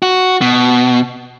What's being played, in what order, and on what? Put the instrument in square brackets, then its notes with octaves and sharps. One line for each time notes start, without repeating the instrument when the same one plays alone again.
[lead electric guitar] F#4
B2